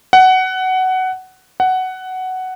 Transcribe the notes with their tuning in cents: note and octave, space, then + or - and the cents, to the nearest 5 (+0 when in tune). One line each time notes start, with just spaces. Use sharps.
F#5 +15
F#5 +10